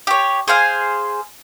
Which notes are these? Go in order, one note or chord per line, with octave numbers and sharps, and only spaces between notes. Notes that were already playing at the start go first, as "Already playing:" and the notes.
G4 C#5
G#4 C5 F5 G#5